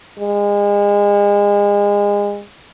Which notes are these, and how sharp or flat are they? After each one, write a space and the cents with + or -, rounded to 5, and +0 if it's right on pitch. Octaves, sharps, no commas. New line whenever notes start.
G#3 -30